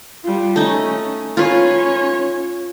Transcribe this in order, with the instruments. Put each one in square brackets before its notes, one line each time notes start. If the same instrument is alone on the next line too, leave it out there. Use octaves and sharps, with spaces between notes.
[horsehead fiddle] G3 F4
[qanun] A3 D#4 [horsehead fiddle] C#4
[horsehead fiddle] C#4 C#5 [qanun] F4 B4